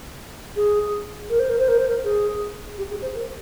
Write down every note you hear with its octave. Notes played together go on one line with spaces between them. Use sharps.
G#4
A#4
C5
A#4
C5
A#4
C5
A#4
G#4
G4
G#4
C5
A#4